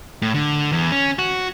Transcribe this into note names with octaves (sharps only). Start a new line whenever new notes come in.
A2
D3
E2
C#4
F#4